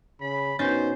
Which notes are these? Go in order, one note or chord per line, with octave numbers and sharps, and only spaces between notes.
C#3 B5
B2 C#4 D#4 C5 G6 A6